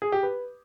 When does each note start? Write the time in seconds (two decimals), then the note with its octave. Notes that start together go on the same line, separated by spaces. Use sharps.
0.02 G#4
0.12 G4
0.23 B4